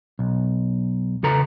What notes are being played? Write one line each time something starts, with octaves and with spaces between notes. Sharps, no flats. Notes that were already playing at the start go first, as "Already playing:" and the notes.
B1
C#3 A4 B4 A#5